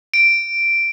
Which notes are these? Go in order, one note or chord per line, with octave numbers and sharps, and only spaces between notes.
D7